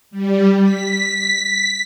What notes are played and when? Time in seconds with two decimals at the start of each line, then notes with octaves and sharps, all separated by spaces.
0.11 G3
0.64 B6